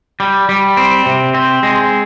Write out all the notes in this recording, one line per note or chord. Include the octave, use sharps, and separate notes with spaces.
G3
G3
C4
C3
C4
G#3